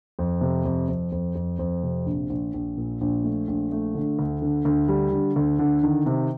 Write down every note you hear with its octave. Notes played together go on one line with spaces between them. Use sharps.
F2
C3
F2
F2
F2
F2
F2
C3
A#1
A#1
A#1
A#2
A#1
A3
A#1
A3
D3
D2
D3
D2
G3
D3
D2
D3
D#3
C3